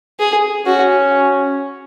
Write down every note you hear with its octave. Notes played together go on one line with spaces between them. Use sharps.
G#4
C#4 F#4